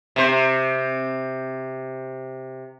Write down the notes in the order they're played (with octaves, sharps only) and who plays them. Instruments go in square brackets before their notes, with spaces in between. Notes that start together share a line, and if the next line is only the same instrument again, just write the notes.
[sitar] C3 C5